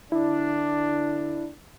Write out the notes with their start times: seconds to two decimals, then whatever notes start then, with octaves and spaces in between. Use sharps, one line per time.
0.12 D3 D4 E4